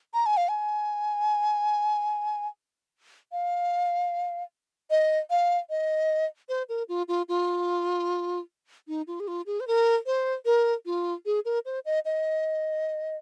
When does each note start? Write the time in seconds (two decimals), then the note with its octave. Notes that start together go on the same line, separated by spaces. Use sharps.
0.14 A#5
0.26 G#5
0.37 F5
0.49 G#5
3.32 F5
4.90 D#5
5.30 F5
5.70 D#5
6.49 C5
6.69 A#4
6.89 F4
7.08 F4
7.29 F4
8.88 D#4
9.07 F4
9.20 G#4
9.28 F4
9.46 G#4
9.60 C5
9.67 A#4
10.06 C5
10.46 A#4
10.86 F4
11.26 G#4
11.45 A#4
11.66 C5
11.86 D#5
12.05 D#5